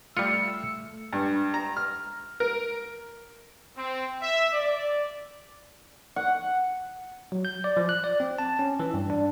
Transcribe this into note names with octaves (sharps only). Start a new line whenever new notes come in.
G3 A3 F4 E6 C#7
G2
A#5
F6
A#4
C4
E5
D5
F#5
F#3
G6
D5
F3
F#6
D5
C4
A5
C#4
E3
G2
D4